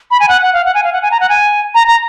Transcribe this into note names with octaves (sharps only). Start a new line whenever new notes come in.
B5
G#5
F#5
F#5
F5
F#5
G#5
F5
F#5
G#5
A#5
F#5
G#5
A#5
A#5